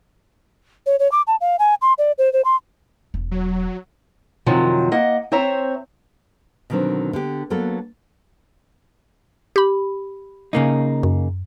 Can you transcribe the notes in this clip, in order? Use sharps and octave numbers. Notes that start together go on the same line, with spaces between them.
C#5
C#5
D6
A5
F5
G#5
C6
D5
C5
C5
C6
E1
F#3
F#2 C3 D#3 F3 F#3
A#3 D#5 F#5
C4 C5 C#5 E5 A#5
B2 D3 D#3 F#3 C4
D3 B3 G4
F#3 A#3 B3 A4
G4 B5
C#3 A#3 D#4
F#2